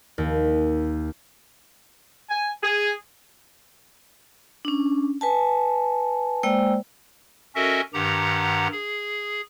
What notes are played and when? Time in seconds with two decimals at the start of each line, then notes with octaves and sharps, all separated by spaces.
0.18 D#2
2.29 G#5
2.63 G#4
4.65 C#4 D4
5.21 B4 G#5 A5
6.43 G#3 A#3 C5 D5 G5 E6
7.55 C#4 F#4 A4 A#4 D#5 E5
7.94 G2 D#3 G4 F#5 A#5
8.72 G#4